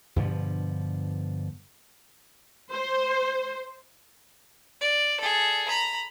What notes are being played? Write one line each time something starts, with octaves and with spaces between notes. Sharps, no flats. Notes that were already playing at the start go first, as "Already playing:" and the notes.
G2 B2 D3 F3
C5
D5
G#4 A4
A#5 B5